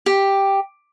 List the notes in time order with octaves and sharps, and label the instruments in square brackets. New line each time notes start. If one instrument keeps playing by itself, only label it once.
[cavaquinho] G4